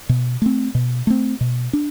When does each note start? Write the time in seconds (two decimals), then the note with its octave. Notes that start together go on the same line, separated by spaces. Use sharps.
0.09 B2
0.42 A3 C4
0.75 B2
1.07 A3 C4
1.41 B2
1.73 D4